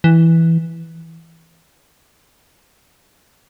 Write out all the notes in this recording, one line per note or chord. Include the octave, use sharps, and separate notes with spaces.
E3